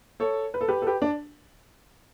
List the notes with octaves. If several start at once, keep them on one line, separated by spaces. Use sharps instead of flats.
A4 C#5
B4
A4
G4 B4
A4
G4 B4
D4